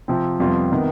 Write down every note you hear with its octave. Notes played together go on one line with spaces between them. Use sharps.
C3 F3 C4
F2 C3 G3 B3 F4
C3 D#3 B3